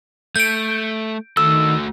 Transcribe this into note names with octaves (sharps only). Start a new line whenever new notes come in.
A3 G6 D7
D#3 A3 F#4 A4 E6